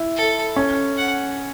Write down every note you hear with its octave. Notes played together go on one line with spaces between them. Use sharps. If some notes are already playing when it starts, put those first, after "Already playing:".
Already playing: E4
A4
C#4
F#5